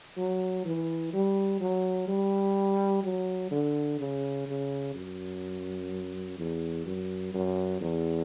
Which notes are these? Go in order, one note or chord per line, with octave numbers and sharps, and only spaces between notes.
F#3
E3
G3
F#3
G3
F#3
D3
C#3
C#3
F#2
E2
F#2
F#2
E2